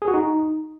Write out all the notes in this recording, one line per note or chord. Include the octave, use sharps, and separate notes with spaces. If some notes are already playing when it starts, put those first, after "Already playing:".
G#4
F#4
D#4